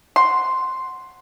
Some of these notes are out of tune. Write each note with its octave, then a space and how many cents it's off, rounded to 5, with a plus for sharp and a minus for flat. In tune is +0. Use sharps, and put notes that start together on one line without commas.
F#5 +0 C6 +0